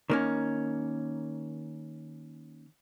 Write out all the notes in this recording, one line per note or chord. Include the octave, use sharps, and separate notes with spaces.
D#3 A#3 C#4